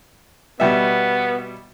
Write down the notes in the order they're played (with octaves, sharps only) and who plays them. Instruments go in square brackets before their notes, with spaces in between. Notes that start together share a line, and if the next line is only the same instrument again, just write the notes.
[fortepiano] B2 G3 E5 [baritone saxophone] B3